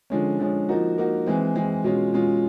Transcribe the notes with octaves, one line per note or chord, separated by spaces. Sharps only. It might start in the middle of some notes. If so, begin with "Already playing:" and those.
D3 F3 G#3 C#4
D3 F3 G#3 C#4
F3 A#3 D#4 F#4
F3 A#3 D#4 F#4
E3 G#3 C4
E3 G#3 C4
B2 G#3 C#4 F4
B2 G#3 C#4 F4